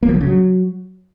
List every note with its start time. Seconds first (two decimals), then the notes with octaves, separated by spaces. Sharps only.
0.03 A#3
0.09 F3
0.15 D3
0.21 C#3
0.27 F#3